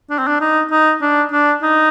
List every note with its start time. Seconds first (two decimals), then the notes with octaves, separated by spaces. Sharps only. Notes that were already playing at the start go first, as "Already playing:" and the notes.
0.10 D4
0.19 C4
0.28 D4
0.41 D#4
0.71 D#4
1.01 D4
1.32 D4
1.63 D#4